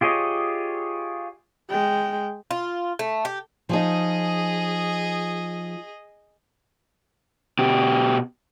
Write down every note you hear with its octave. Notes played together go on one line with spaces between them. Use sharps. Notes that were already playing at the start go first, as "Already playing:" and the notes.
F4 G4 G#4 C#5 D#5
G#3 G5
F4
A3
G4
F3 D#4 G#4 D#5
B2 G4